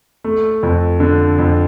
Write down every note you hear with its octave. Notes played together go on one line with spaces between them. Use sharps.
A3
F2
D3
F2